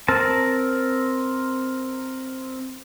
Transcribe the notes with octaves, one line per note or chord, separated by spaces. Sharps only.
C4 A#4 A5